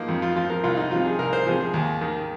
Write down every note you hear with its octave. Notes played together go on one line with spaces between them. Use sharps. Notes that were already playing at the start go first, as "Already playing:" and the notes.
Already playing: F3 A#3 D#4
F2
F4
F3 F4
A#4
C2 F4
D#4
C3 F3 F4
G#4
C2 A#4
C5
C3 F3 G#4
G#4
D#2
D#3